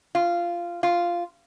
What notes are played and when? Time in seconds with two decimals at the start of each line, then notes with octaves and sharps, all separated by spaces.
0.15 F4
0.83 F4